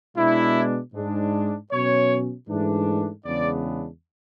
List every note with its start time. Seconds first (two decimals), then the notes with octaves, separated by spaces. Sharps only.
0.17 B2 G#3 B3 D4 E4
0.94 G#2 G#3 D4
1.71 B2 F#3 C#4 C#5
2.48 G#2 E3 A3 D4
3.25 E2 C#3 G#3 B3 D4 D5